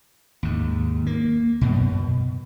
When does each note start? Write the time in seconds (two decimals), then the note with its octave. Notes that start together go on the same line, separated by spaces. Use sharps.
0.43 D#2 G#2
1.07 A#3
1.61 F#2 B2
1.91 B2